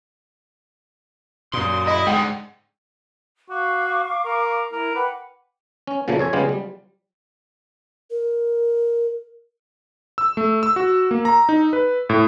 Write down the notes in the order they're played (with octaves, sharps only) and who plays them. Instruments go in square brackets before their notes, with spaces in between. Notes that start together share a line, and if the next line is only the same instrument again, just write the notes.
[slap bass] F#2 A#2 [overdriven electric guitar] C6 [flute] D#6
[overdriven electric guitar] E4 [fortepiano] D#5
[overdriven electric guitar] G#2 D3 [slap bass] G#3 [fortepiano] F#5 G5
[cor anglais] F#4 [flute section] F5 C#6 D6
[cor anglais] A#4
[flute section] E4 [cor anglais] A#4
[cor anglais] B4 [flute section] F#5 G5 D6
[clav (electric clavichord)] C#4
A#2 C#3 F3 F#3 A3 A#3
F2 C#5 G#5
C#3 G3 G#3 B3 F4 G4
G3
[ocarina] A#4
[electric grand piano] E6
A3
E6
F#4
A#3
A#5
D#4
B4
A2